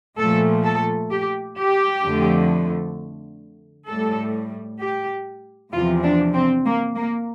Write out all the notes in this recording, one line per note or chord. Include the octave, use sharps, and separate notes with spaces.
A#2 F3 A3 A4
A4
G4
G4
F2 D3 F3 A3
A2 G3 A4
G4
E2 C3 F3 F4
D4
C4
A#3
A#3